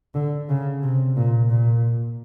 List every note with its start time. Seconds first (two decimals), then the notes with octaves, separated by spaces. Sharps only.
0.14 D3
0.49 C#3
0.83 C3
1.16 A#2
1.50 A#2